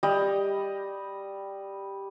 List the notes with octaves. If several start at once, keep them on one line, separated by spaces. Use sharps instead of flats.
G3 D#5